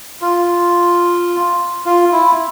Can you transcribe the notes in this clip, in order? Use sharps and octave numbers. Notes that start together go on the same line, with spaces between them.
F4
F4
E4